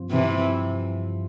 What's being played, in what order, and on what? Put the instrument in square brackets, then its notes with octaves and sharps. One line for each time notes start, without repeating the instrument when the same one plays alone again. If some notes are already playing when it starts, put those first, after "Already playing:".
Already playing: [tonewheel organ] G2 F3 C4
[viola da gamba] C3 E3